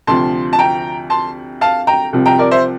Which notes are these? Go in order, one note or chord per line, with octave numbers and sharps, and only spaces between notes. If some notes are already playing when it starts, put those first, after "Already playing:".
D2 C3 F3 A5 C6
A5
G5 A#5
A5 C6
F5 A5
G5 A#5
C2 C3 F3
G5 A#5
A#4 D5
C5 E5